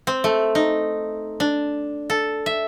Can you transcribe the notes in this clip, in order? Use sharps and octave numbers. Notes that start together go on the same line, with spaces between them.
C4
A3
D#4
D4
A4
E5